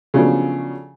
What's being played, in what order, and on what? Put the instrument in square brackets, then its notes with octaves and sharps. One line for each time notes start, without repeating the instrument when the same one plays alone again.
[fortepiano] C#3 F3 F#3 A3 B3 D4